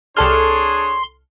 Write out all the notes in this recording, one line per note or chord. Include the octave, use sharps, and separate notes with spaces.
C2 D4 G#4 A4 C#5 C6 F6